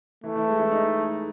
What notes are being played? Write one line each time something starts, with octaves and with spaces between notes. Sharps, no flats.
E3 A3
E3
G#3
E4
D#4